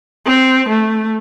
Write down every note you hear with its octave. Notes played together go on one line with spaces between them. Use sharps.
C4
A3